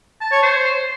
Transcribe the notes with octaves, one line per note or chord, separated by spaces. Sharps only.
A5
C#5
C5